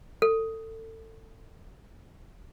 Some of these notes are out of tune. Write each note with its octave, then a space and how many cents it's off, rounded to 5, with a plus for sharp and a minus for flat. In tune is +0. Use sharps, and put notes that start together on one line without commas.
A4 +25